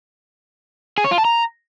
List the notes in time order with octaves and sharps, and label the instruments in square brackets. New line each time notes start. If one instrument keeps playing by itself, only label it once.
[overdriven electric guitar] G#4
C#5
F4
A5
A#5